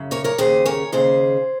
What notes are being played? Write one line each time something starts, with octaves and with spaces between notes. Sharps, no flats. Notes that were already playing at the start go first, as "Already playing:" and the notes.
Already playing: F#2 C#3
A#4 C#5
A#4 C#5
D#2 C#3 G#4 C5
A#4 C#5
D#2 C#3 G#4 C5